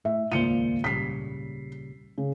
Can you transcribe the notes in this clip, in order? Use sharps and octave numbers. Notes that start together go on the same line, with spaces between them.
A2 E5
D#1 G#1 C#2 A#2 F4 C5 C#7 D#7
A#2 C#3 G3 B6 C7
C#3